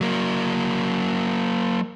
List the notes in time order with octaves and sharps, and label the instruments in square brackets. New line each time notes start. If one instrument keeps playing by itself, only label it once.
[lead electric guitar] F#3 A#3